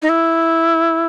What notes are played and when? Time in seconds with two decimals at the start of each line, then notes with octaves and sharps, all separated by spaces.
0.02 D#4
0.09 E4